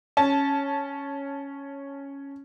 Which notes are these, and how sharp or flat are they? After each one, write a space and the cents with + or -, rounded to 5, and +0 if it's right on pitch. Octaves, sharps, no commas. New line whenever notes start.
C#4 +0 A5 -15